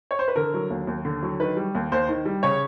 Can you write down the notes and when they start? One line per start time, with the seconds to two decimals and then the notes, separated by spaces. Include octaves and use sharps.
0.11 C#5
0.19 C5
0.28 B4
0.36 D3 A#4
0.54 F#3
0.70 D#2
0.87 D#2
1.05 D3
1.23 F#3
1.40 D#3 B4
1.57 G3
1.75 D#2
1.92 D#2 C5
2.09 D#3
2.25 G3
2.43 C#3 C#5